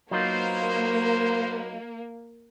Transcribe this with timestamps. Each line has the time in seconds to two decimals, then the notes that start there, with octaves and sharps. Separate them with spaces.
0.11 F#3 A#3 B3 D#4 F4 C5